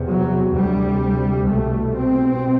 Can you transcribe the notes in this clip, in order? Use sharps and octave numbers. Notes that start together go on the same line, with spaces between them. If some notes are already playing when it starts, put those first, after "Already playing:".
Already playing: E2 C3
F#3
D2 C3 G3
C2 B2 A3
C4